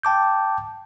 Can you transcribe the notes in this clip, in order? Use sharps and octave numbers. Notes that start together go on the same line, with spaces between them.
G5 A5 D6 G6